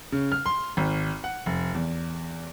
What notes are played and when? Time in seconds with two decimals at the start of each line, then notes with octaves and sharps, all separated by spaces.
0.12 C#3
0.32 F6
0.46 C6
0.77 G#1
1.24 F#5
1.46 F1
1.75 E2